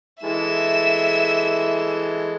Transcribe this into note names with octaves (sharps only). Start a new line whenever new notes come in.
E3 G#3 A4 E5 E7